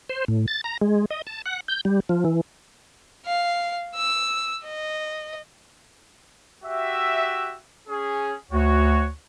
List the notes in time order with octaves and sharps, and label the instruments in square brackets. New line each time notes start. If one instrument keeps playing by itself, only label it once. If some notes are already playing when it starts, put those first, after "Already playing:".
[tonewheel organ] C5
A2
A6
A#5
G#3
D#5
A5
F#5
G6
G3
F3
E3
[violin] F5
E6
D#5
[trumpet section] F#4 G4 E5
C#4 G#4
[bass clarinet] D2 [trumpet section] F#4 C#5